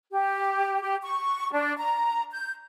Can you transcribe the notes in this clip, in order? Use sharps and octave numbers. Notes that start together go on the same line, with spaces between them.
G4
G4
C#6
D4
A#5
G6